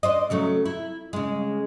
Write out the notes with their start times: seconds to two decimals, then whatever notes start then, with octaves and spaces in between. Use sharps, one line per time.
0.03 D4 C5 D#5
0.30 C#3 F#3 A3
0.66 E4
1.13 C#3 G#3